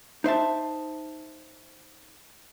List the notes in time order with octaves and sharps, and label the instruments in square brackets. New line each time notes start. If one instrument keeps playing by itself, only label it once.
[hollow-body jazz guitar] D#4 C5 E5 A5